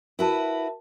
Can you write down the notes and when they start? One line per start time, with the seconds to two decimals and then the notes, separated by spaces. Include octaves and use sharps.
0.19 E4 F#4 A#4 B4 A5